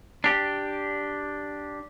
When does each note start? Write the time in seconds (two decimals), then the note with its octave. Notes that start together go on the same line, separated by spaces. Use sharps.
0.24 D4 G4